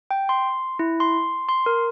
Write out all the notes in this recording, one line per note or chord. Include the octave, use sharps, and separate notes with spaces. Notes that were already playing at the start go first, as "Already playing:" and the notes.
G5
C6
E4
C6
C6
A#4